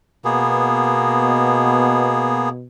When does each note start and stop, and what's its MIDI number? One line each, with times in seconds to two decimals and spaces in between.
0.25 2.67 47
0.25 2.49 58
0.25 2.49 59
0.25 2.49 68